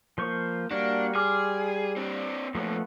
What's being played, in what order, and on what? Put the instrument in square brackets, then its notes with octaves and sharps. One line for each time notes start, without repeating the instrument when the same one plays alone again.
[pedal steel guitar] F3 C5 C#6 [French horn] A#3
[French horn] G3 [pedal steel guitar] A#3 F#4 [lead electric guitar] D4
[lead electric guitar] G#4 [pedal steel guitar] C6 D6 F6
[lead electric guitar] C4 D4
[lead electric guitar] F#2 A#2 [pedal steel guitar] F3 A3 B3